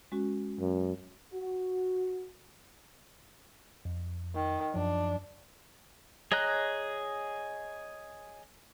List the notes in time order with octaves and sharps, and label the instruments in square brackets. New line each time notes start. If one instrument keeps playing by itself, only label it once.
[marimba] G#3 C#4 F#4
[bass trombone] F#2
[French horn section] F#4
[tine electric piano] F2
[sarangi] D#3
[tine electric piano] F#2 F3 [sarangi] D4
[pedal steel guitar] G#4 C#5 D#5 A#5 F#6